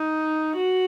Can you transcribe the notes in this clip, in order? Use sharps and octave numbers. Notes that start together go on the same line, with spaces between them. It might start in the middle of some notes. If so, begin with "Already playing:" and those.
Already playing: D#4
F#4